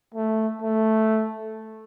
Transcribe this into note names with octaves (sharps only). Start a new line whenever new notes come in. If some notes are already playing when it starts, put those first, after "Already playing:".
A3
A3